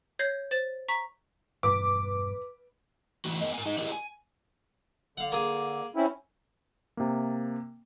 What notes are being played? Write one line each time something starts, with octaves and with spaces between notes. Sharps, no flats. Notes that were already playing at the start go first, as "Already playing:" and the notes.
C#5 G6 G#6 A#6 C7
C5 A6 E7
A#5 C#6 B6
E1 G2 B2 B4 D6
E3 A3 F#4
B3 A#4 D#5
A#4 G#5
D#4 G#4 D#5
E4 G4 G#4 A#4 D5 D#5
G#5
D3 F5 F#5
A#3 G#4
C4 C#4 E4
C3 A#3